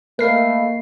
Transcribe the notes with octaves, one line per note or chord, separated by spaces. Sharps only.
A3 A#3 A#4 D#5 F5 B5 C7